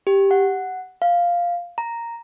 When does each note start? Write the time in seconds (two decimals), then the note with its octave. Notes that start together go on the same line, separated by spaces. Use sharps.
0.07 G4
0.31 F#5
1.02 F5
1.78 A#5